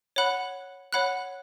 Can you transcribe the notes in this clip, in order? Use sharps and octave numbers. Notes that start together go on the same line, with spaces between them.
C#5 F#5 B5 F#6
C#5 F#5 B5 F#6